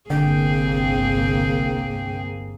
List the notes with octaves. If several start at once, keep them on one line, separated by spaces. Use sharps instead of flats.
G1 C2 D3 A#3 C4 G#4 G5